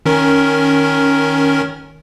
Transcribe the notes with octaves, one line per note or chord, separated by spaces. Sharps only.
D#3 C#4 A#4